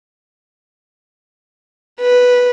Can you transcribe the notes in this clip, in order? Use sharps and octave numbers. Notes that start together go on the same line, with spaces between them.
B4